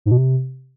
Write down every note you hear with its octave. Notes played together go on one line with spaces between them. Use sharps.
G#2
B2
C3